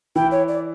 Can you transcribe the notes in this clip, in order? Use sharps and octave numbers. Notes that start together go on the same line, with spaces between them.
E3 E4 G5
C#5
D5